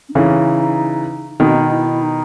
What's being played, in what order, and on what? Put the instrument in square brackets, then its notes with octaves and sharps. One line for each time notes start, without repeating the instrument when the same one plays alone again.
[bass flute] C#4
[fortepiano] C#3 E3 [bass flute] D#4
[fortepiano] B2 D#3 [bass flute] D#4
[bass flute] E4
D#4